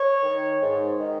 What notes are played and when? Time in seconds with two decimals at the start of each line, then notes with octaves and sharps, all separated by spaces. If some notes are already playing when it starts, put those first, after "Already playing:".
Already playing: C#5
0.23 D#3
0.61 G#2
0.99 D#3